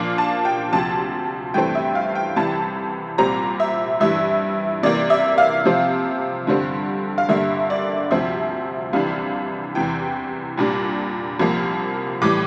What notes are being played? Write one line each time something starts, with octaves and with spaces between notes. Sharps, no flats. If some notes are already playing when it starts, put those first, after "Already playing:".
Already playing: A#2 F3 A#3 D4 F5
A5
G5
D2 C3 F3 A5
G2 E3 A3 C4 G5
E5
F5
G5
C2 C3 E3 G3 A5
C2 A#2 G3 C4 A#5
E5
G2 E3 G3 E5
C3 E3 A#3 D5
E5
F5
C3 F3 C4
G2 D3 G3 C4
F5
G2 D3 G3 A#3 E5
D5
D2 C3 F3 C4 E5
C2 C3 E3 G3 D4 F5
E2 C3 E3 G5
C2 A#2 G3 D4
C2 C3 F3 A#3
A2 E3 G3 D6